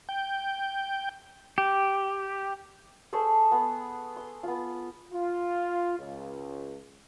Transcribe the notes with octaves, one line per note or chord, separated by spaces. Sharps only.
G5
G4
G#4 A4 C5 C#6
B3
C6
B3 F4
F4
C#2